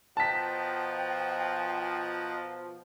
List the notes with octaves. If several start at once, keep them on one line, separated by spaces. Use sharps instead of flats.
B2 F3 D#5 F#5 G5 A5 A#5 B6